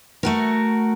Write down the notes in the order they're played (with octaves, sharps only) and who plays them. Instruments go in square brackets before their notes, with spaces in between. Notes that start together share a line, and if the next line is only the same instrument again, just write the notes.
[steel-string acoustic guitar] A3 F#4 A#4